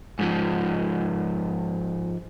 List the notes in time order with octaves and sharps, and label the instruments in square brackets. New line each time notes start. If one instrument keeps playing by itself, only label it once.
[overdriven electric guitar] G#2 F3